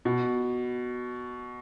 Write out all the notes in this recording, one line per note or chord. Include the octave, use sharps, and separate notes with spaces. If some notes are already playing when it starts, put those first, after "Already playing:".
B2